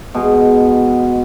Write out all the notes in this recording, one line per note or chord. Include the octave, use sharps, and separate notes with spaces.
B2 G#3